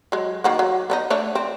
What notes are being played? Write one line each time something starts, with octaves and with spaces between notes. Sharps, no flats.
F#3 G#3
D#3 A#3 F#4
F#3
B3 D4 D#4
A3 D4 C#5
C4